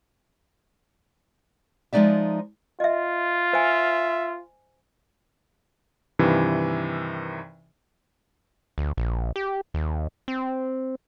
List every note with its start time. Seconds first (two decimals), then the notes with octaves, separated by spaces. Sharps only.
1.93 F3 G#3 B3 D#4 D5 E5
2.80 F4 D#5 E5
3.53 C5 E5 G#5
6.19 G2 C3 D#3 E3
8.78 D2
8.97 A#1
9.36 G4
9.74 D#2
10.28 C4